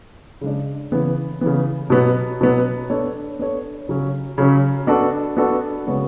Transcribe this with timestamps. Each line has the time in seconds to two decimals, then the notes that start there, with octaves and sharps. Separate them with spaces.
0.41 C#3 G#3 D4
0.92 C#3 E3 B3
1.41 C#3 E3 B3
1.90 B2 F#3 B3
2.41 B2 F#3 B3
2.90 B3 D4 A4 C#5
3.39 B3 D4 A4 C#5
3.89 C#3 F#3 C#4
4.38 C#3 F#3 C#4
4.87 B3 D4 F#4 A4
5.37 B3 D4 F#4 A4
5.87 C#3 G#3 B3 F#4 C#5